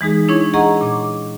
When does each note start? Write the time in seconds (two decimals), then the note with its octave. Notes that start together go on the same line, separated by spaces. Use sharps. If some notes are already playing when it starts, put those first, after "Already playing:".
0.01 E3 G#3 D#4 G#4
0.29 D4 E4 C#5 C#6 G#6
0.54 G#4 D#5 F#5 A#5 C#6
0.81 A#2 D6